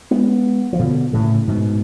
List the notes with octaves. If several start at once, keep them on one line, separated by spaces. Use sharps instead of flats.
G#3 B3
F3
B2 D3
A2 C#3
G#2 B2